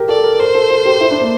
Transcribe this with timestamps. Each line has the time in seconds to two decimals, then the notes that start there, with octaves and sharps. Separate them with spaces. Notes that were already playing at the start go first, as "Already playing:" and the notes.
Already playing: G4 A#4
0.09 A4 D5
0.24 A#4
0.39 A#4 C5
0.55 A4
0.70 A4
0.85 G4
1.00 E4
1.11 D4
1.21 A#3